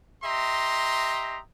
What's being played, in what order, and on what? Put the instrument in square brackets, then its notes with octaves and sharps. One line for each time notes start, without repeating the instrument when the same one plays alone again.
[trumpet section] G4 D#5 E5 A#5 C6